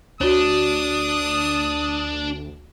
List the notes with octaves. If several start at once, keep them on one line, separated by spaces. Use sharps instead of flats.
D2 D4 F#4 C#5 D#6